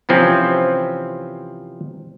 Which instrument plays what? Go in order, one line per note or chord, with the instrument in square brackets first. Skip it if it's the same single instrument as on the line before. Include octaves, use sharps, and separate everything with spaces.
[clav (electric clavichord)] C3 E3 F3 C4 C#4